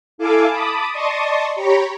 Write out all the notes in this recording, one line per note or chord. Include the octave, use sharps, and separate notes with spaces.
E4 A4 F5 G#5 A5 D6
A5 B5 D6 D#6
D5 D#5 A5 C6 C#6 D#6
G4 C#5 A#5 B5 C#6